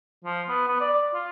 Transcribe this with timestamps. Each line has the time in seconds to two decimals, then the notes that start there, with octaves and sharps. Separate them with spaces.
0.24 F3
0.49 B3
0.67 B3
0.80 D5
0.93 D5
1.14 F4